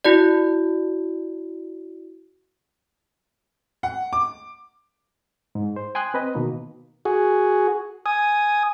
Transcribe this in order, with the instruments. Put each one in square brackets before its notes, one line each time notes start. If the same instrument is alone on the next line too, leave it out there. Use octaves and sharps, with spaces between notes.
[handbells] E4 F#4 D5
[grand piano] F#5
D6
[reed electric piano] G#2
C5
G5 G#5 C6 D#6 F#6
C4 B4 D#5
B2 D#3 A#3
[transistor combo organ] F#4 G#4
G#5 D#6